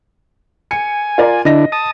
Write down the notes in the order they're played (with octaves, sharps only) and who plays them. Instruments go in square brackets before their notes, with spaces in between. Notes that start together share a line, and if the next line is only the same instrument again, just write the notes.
[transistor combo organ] G#5 [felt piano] C#7
[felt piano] F4 A#4 D5
[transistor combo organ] D3 D4 E4 [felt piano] D#5 A#6
[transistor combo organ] A5 D#6